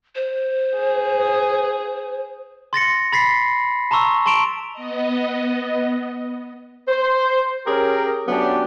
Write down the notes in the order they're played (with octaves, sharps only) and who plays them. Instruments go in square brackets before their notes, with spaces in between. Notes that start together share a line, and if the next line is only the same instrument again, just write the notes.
[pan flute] C5
[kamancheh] G#4
[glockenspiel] C6 A6 A#6 C#7
B5 A6 B6 C7
A5 A#5 C6 C#6 E6
A5 C6 C#6 D7 E7 F7
[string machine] B3 D#5
[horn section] C5
C#4 G4 G#4 A#4
F#3 A3 B3 C#4 D4 G4